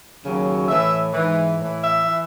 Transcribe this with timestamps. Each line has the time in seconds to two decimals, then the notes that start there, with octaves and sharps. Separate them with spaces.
0.23 D#2 C#3 F#3
0.68 A2 E3 E5
1.14 G#2 E3
1.59 A2 E3
1.82 E5
2.06 E3